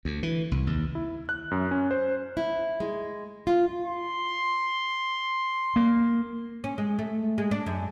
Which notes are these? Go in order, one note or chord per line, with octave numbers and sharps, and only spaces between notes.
D2
E3
C2
D#2
E4
F#6
F#2
C#4
C5
E4
G#3
F4
C6
A#3
C#4
G#3
A3
G#3
D4
F#2